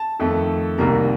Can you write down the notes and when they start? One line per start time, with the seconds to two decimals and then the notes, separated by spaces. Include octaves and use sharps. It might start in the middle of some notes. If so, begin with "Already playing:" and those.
Already playing: A5
0.19 F2 D#3 A3
0.78 C2 C3 D#3 G3 A#3 A#5